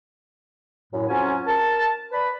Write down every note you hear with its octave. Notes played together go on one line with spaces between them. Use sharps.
F#2 A2
F2 F#3 C#4 F4 G#5
A#4 A5
B4 D5 B5